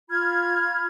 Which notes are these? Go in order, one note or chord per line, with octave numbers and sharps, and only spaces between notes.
F4 B5 F6 G#6